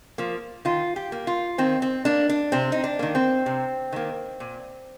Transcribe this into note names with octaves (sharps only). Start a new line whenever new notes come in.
F3 A#3
D#3 F4
G4
A#3
F4
D#3 C4
C4
A#3 D4
D4
C3 C4
D#4
D4
D#3 A#3
C4
C3
D#3 A#3
A#2